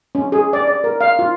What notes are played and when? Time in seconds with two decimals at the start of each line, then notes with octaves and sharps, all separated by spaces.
0.15 C#4
0.32 G#4
0.53 D5
0.68 D5
0.84 A#4
1.01 F5
1.19 F4